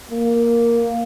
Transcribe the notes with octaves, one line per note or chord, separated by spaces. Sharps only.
A#3